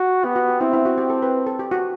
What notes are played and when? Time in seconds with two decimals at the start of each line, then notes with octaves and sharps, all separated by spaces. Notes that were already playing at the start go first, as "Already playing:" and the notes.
Already playing: F#4
0.24 B3 G4
0.36 F#4
0.49 G4
0.60 C4 E4
0.73 E4
0.85 F#4
0.98 G4
1.10 A4
1.22 B4
1.47 A4
1.59 G4
1.71 F#4